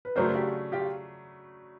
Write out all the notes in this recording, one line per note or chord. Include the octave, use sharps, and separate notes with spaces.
B4
C#3 F#3 A3 D4 A#4 C5
F4 G4
F4 G4